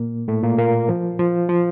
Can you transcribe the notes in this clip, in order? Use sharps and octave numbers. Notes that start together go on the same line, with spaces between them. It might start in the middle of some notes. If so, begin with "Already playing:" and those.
Already playing: A#2 A#3
A2 A3
A#2 A#3
A#2 A#3
F3
F3
F3